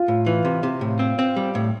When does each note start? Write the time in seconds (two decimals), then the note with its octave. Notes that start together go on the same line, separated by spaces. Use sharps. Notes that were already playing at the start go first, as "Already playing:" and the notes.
Already playing: F4
0.08 A2
0.26 E3
0.45 C3
0.63 C3
0.81 A2
0.99 C4
1.19 C4
1.36 G3
1.55 A2